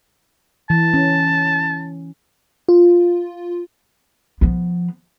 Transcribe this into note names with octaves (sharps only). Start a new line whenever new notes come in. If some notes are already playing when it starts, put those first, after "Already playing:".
E3 A5
C#4
F4
F3 B3